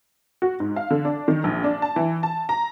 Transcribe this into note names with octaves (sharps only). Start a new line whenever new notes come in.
F#4
G#2
F5
D3
D4
D#3
A#1
D4
A5
E3
A5
A#5